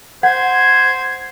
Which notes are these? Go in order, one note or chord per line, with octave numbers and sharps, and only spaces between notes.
C5 F#5 G#6